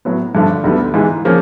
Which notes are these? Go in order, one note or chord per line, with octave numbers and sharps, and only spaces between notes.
A2 F#3 B3
G2 D3 F3 A3
D2 D3 G3 B3
G#2 E3 G#3
C#3 F3 A#3 C#4